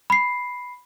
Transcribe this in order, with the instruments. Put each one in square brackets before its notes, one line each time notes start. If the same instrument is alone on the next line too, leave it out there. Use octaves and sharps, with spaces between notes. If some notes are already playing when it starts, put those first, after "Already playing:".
[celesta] B5 C7